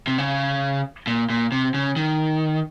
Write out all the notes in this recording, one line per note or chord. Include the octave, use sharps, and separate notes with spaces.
C3
C#3
A#2
A#2
C3
C#3
D#3